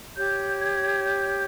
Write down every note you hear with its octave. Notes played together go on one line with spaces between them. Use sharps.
G4 C#5 G6
G#6
G6